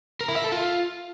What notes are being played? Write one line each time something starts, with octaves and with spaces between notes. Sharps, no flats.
A#4
E4
E5
A4
F4